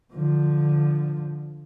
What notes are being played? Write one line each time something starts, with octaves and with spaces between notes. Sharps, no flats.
D3 F3